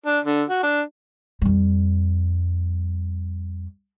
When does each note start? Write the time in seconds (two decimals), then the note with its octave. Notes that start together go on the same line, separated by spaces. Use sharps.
0.06 D4
0.24 D3
0.49 F#4
0.63 D4
1.42 F2 G3